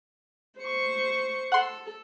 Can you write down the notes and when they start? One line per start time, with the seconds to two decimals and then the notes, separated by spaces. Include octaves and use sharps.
0.59 C5 C#6
1.52 A4 F#5 C6